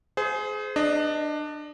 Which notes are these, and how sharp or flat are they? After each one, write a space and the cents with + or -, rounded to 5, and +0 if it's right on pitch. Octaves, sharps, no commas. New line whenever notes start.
G#4 +25 C5 -25
D4 +20 D#5 +0